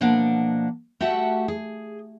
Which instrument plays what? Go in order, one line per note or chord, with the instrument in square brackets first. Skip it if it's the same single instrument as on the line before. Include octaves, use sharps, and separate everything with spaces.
[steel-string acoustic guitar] B2 F3 A#3 D4 F#5
A3 F#4 G4 E5 F#5 A5
G#4